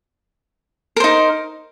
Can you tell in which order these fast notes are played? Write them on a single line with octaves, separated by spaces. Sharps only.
A#4 C5 D#4